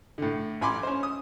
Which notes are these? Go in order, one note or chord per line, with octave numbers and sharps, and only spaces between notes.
A2 D3
A1 G#5 B5 C6 D6
C#4 C5
D#6